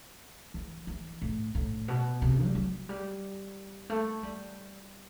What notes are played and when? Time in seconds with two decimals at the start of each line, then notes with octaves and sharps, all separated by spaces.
0.54 E3
0.87 E3
1.22 A2
1.55 A2
1.88 B2
2.22 C3
2.44 G3
2.55 F#3
2.89 G3
3.90 A3
4.23 G3